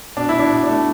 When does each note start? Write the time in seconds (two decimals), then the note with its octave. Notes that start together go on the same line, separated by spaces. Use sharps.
0.17 B2 D4
0.29 B2 E4
0.39 D4
0.51 B2
0.64 D4
0.69 A3